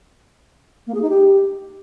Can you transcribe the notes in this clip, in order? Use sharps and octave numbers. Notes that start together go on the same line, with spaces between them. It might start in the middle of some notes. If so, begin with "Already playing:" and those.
A#3
G#4
D#4
G4